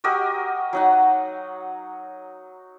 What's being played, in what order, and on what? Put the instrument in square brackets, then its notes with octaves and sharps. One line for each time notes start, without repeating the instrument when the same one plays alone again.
[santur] F#4 G4 A#4 D#5
F#3 D#4 F#5